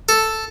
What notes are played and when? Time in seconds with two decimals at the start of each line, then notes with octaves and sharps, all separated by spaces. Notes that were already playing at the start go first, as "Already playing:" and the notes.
0.09 A4